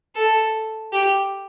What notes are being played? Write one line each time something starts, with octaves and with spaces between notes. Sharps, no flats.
A4
G4